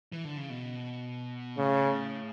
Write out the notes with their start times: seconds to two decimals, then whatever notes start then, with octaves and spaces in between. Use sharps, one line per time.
0.12 E3
0.24 D3
0.37 C#3
0.50 B2
1.57 A2 C#3